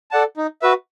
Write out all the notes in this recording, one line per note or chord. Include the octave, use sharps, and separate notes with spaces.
A4 D5 F#5 A5
D#4
F#4 B4 E5